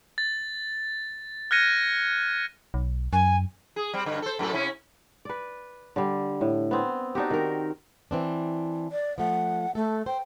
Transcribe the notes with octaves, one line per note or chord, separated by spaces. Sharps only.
A6
F6 F#6 G#6 A#6 C#7 D#7
B1
F#2 G#5
G#4
G3 C4
G2 D3
A4 C5
F#2 A2 A4
C3 C#4 E4
B4 D5
D3 G3
A2
B3 C4
D4 D#4 F#4 G4
D#3 A#4
E3 C4 D4
D5
F3 A3 F#5
A3 A4
C5 G5